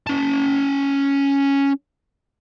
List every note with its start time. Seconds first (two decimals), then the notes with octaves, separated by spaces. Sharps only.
0.07 C#4 A5